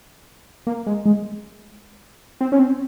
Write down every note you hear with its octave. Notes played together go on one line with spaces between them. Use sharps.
A#3
G#3
G#3
C4
C#4
C4